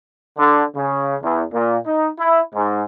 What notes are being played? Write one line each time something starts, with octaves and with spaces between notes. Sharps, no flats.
D3
C#3
E2
A#2
D#4
E4
G#2